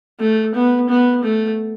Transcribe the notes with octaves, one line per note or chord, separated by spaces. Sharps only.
A3
B3
B3
A3